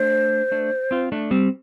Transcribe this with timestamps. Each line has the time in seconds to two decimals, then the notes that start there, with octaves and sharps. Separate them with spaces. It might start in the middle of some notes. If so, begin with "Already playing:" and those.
Already playing: A3 D4 C5
0.52 A3 D4
0.91 C4 F4
1.12 A3 D4
1.31 G3 C4